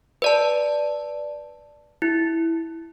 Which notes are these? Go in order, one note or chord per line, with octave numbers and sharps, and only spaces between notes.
B4 D5 A5
E4